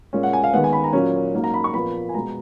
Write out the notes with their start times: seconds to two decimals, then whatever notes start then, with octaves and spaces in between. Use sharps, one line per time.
0.13 A#2 G#3 C#4
0.23 F#5
0.33 G#5
0.44 F5
0.53 D#2 D#3 G#3 B3 F#5
0.64 G#5
0.73 B5
0.84 A#5
0.93 A#2 F#3 C#4
1.34 G#2 F#3 A#3
1.44 A#5
1.54 B5
1.64 C#6
1.74 A#2 F3 B3 B5
2.09 G#5
2.14 B2 G#3 B3 A#5